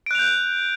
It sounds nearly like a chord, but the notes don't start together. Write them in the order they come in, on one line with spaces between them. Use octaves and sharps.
D7 F#6 F7 G6